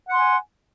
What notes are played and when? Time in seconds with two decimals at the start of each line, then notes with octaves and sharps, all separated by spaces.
0.08 F#5
0.12 C6
0.16 G#5